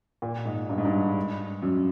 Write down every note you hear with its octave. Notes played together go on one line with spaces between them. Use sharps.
A#2
G#2
G2
G#2
G2
F#2